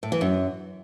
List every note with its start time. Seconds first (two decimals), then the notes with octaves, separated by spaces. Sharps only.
0.03 A2
0.12 E3
0.21 F#2